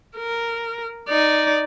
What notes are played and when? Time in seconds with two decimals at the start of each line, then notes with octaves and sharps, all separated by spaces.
0.17 A#4
1.09 D#4 D5